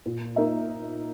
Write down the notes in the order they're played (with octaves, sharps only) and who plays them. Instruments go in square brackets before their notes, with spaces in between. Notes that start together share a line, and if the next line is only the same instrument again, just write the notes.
[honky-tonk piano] A#2
A#3 D#4 A#4 E5